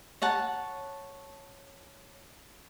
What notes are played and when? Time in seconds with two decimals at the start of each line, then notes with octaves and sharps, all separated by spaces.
0.22 C#5 F#5 A5